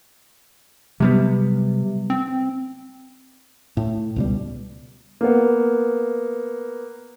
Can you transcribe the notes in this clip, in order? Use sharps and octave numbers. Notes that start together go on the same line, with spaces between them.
C3 F#3 G3 B3
C4
A2
C#2 B2 G3
A#3 B3